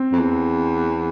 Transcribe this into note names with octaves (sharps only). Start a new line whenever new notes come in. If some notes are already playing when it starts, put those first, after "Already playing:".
Already playing: C4
F2
E2